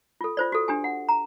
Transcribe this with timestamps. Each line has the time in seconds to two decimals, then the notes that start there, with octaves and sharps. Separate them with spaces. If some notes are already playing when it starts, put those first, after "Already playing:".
0.21 F4 A4
0.37 F4 C5 D5
0.52 F#4 A4
0.68 D4 G4 G#5
0.84 F#5
1.09 A#5